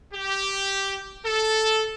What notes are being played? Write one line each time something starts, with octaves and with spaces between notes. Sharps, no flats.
G4
A4